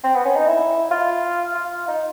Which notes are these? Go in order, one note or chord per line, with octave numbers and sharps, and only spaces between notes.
C4
B3
C#4
D#4
E4
F4
F4
D#4